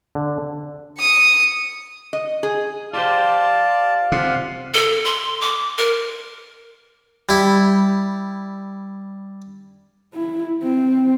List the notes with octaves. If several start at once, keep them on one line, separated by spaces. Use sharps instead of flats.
D3
D#6 C#7
D#5
G#4
F4 G4 C5 D5 F5 A5
C3 F4 F#5
A4
C6
D6
A#4
G3 E4
E4
C4